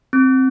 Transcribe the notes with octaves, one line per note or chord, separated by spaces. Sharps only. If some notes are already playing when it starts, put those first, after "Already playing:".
C4